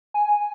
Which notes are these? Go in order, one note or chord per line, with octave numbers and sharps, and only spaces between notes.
G#5